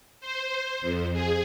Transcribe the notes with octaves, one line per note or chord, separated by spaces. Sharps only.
C5
F2
G#4